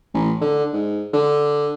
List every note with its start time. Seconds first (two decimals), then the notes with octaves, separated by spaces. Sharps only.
0.14 A1
0.41 D3
0.73 G#2
1.14 D3